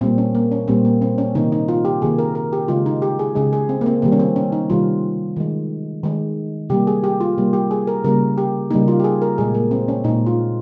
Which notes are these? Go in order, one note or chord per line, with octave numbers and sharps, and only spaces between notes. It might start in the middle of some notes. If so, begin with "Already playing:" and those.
A#2 G3 A#3 C4
C#4
A#3
C#4
A#2 G3 A#3 C4
A#3
C4
C#4
C3 D#3 A#3 D#4
D#4
F4
G4
C3 D#3 A#3 G#4
A#4
A#4
G4
C#3 G#3 F4
D#4
G4
G#4
C#3 G#3 G#4
G#4
C4
A#3
C4
C3 D#3 G3 A#3
C#4
C4
C#4
D#4
C3 D#3 G3 F4
D#3 G#3
D#3 G#3
C3 G3 A#3 G4
G#4
G4
F4
C3 G3 A#3
G4
G#4
A#4
C#3 G3 A#3 A#4
G4
C#3 G3 A#3 D#4
F4
G4
G#4
A#4
A#2 G#3 G#4
A#3
C4
C#4
A#2 G#3 D#4
F4